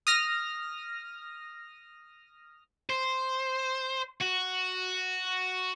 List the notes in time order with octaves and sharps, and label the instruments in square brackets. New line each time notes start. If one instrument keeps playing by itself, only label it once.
[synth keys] D#6 F6 A#6
[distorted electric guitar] C5
F#4